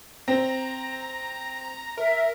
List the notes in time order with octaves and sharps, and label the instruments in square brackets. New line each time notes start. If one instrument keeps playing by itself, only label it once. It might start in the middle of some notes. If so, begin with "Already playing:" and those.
[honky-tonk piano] C4 [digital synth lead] A#5
[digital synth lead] A#4 [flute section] E5